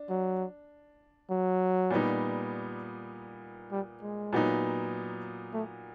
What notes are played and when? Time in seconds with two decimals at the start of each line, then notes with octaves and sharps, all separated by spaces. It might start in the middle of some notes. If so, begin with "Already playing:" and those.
Already playing: D4
0.09 F#3
1.30 F#3
1.90 A#2 G3 B3 D#4
3.72 G3
4.02 G#3
4.33 A#2 F#3 B3 D#4
5.53 A3